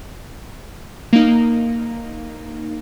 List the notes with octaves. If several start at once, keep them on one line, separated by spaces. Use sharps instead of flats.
A#3 D#4